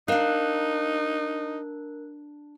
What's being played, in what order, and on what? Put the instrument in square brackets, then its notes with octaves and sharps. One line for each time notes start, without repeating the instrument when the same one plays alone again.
[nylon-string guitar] D4 F5 [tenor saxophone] D#4 [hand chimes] A#4 F#6